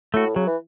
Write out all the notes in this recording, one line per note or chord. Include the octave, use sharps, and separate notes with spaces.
A2 A3 F#4
C#3 F#3
E3